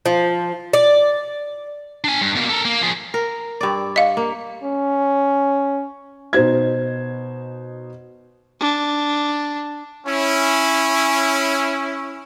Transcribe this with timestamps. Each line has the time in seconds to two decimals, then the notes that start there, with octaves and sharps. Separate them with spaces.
0.06 F3
0.73 D5
2.04 D4 G#5
2.21 G2
2.35 B2 A#3
2.49 A4 A#4
2.65 A#3
2.82 F3 G#4
3.14 A#4
3.61 G2 D5
3.96 D#5 F5
4.17 A#3
4.64 C#4
6.33 B2 D#4 C5 G#6
8.60 D4
10.06 C#4 E4